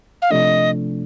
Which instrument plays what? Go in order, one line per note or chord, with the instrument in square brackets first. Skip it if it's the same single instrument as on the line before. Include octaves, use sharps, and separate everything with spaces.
[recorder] F5
[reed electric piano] C3 F3 A3 D4 [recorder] D#5